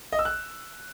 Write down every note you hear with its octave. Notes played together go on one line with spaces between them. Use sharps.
D#5
E6
F#6